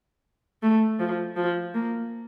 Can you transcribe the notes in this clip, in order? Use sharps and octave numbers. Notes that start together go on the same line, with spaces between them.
A3
F3
F3
A#3